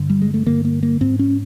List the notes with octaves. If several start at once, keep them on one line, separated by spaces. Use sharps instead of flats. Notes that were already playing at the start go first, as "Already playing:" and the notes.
Already playing: G2 D3
G3
G#3
A3
G2 D3 A#3
A#3
A#3
G#2 C4
C#4